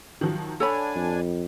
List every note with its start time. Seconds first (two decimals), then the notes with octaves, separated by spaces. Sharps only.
0.21 D#3 F3 F#3
0.60 D4 A4 C#5 F#5 G#5 B5
0.95 F2